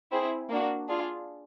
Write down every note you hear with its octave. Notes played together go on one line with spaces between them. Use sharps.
C4 E4 G#4
A#3 D4 F#4
D4 F4 G#4